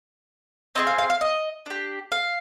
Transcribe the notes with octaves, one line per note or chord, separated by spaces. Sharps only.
C4 F4 G#4 D#5
F5
F5
F5
D#5
D4 G4
F5